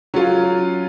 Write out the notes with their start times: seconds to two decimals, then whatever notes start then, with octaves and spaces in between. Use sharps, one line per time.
0.14 F#3 C#4 F4